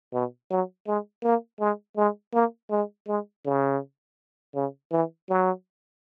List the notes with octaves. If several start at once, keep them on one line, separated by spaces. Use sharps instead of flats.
B2
F#3
G#3
A#3
G#3
G#3
A#3
G#3
G#3
C#3
C#3
E3
F#3